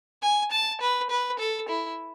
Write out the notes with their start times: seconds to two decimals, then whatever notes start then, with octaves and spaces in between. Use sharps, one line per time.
0.22 G#5
0.51 A5
0.81 B4
1.10 B4
1.39 A4
1.68 E4